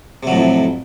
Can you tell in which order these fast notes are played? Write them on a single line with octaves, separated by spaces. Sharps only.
C3 F#3 A2 F2